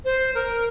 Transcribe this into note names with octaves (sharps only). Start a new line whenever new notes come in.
C5
A#4